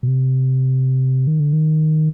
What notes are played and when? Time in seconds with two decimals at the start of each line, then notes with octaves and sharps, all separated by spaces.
0.03 B2
0.08 C3
1.27 D#3
1.40 D3
1.53 D#3